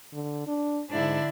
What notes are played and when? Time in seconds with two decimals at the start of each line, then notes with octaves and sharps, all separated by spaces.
0.13 D3
0.47 D4
0.91 G#2 D3 D4 E4